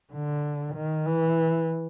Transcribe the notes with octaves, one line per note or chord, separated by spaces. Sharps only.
D3
D#3
E3